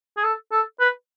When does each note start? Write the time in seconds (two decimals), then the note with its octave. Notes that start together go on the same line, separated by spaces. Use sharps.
0.17 G#4
0.24 A4
0.52 A4
0.80 B4